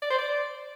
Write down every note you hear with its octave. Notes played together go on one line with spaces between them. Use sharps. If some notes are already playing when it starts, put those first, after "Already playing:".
D5
C5
D5